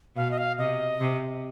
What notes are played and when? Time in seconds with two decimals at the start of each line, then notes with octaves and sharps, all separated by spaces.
0.16 B2 F5
0.31 D#5
0.38 F5
0.58 C3 D#5
1.00 C3